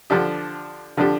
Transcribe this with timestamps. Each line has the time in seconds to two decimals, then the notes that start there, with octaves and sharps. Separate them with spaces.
0.10 D3 F3 D4 G4
0.97 D3 F3 D4 G4